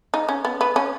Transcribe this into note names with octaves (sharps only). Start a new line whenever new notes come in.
D#4
C#4
B3
B3
C#4